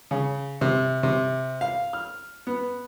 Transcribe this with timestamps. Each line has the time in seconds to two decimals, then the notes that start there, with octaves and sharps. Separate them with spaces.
0.11 C#3
0.61 C3
1.03 C3
1.61 F5
1.93 F6
2.47 B3